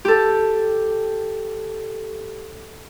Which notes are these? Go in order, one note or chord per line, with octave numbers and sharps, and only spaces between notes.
G4 A4